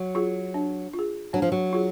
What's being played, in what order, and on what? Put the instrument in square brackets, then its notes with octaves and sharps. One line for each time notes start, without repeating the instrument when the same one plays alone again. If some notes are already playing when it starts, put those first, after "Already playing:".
Already playing: [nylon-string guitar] F#3
[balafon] F4 G#4
D4
F4
G#4
[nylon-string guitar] F#3 [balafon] D4
[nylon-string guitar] F3
F#3
[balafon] F4 G#4